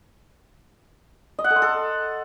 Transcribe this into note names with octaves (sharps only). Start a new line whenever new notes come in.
D#5
F#5
A4
C6
A4